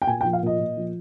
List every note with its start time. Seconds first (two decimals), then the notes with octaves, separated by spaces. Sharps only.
0.02 G5
0.07 A#2 G#5
0.21 G5
0.24 F3
0.33 F5
0.43 A#2 D#5
0.59 A#2
0.77 F3